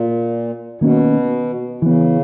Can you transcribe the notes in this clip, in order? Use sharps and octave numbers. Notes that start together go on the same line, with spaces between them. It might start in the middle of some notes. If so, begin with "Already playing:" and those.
Already playing: A#2
B2 D#3 A#3 C#4
C#3 E3 B3